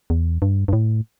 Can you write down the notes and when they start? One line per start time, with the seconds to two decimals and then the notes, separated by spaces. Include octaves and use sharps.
0.10 E2
0.42 G2
0.68 G2
0.73 A2